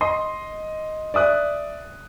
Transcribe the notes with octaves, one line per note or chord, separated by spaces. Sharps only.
D#5 C6
D5 E5 D#6 F#6